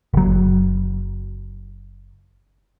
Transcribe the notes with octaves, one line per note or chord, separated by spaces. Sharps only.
F#1 F#3